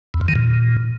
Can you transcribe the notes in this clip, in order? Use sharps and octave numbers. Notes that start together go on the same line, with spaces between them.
E2
F2
D#3
A#2